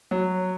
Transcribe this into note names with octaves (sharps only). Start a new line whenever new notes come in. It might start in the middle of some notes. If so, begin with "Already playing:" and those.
F#3